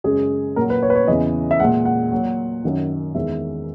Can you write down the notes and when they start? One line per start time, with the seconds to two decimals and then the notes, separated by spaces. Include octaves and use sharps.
0.04 F#2 C#3 G#3 G#4
0.56 A#2 F#3 A#4
0.70 B4
0.83 C#5
0.90 B4
0.95 C#5
1.08 E2 C#3 E3 D#5
1.51 E5
1.60 G#3 F#5
1.64 A#2
1.85 F#5
2.12 A#2 F#3
2.64 F#2 D#3 F#3
3.15 E2 D#3 G#3 E5